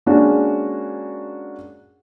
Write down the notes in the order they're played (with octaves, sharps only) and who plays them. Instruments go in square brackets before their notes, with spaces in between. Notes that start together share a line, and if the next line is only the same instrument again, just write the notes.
[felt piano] G#3 A#3 C#4 D4 F#4 G#4